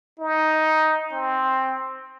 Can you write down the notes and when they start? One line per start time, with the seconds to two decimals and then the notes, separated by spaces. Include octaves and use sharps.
0.20 D#4
1.12 C4